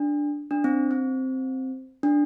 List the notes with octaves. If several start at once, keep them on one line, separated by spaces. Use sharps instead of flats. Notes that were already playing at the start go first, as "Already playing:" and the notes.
Already playing: D4
D4
C4
C4
D4